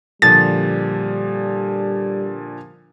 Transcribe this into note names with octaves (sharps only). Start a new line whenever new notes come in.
A#2 D3 F3 G3 A6